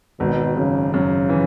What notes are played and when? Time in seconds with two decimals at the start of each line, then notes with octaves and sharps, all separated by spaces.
0.20 G#1 B2
0.57 F#2 C#3
0.94 F#2 C#3
1.29 E3